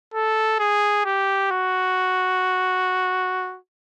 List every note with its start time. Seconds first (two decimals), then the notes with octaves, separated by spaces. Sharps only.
0.14 A4
0.59 G#4
1.05 G4
1.51 F#4